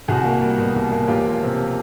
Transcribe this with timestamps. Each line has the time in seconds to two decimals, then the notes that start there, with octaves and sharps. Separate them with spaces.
0.08 C2 F#4 G#4
0.25 A#3
0.42 G3
0.58 B2
0.75 C2
0.92 A#3
1.08 E1 F4 G4
1.24 F3
1.42 C3